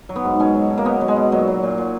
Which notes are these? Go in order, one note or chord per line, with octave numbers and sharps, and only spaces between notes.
F#3
B3
G#2
B2 C#4
F#3
B2
A#3
B2 B3
F#3
G#3
B2
A#2 F#3
F#3
A#2
A#2